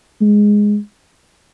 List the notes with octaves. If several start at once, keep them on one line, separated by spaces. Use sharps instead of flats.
G#3